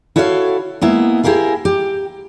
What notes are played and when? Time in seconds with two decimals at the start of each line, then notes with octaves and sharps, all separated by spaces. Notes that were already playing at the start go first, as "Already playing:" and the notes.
0.16 E4 F#4 A4 C#5 D#5 F5
0.81 G#3 A#3 B3 E4
1.24 E4 G4 G#4 A#4 F5
1.65 G4